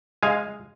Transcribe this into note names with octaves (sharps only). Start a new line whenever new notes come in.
G#3 F5 G#5